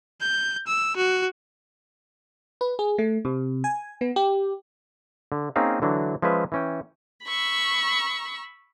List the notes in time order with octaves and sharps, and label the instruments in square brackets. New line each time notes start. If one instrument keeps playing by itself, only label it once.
[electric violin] G6
E6
F#4
[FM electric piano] B4
G#4
A3
C3
G#5
B3
G4
[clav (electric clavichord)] D3
A#3 C4 C#4 D#4 G#4 F5
D3 E3 F#3 D4 F#4
F3 G#3 C#4 B4 E5
E3 C#4 G5
[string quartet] B5 C#6 E6